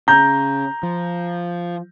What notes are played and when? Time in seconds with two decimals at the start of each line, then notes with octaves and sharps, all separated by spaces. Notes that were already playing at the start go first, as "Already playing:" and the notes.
0.08 C#3 A#5 G6
0.83 F3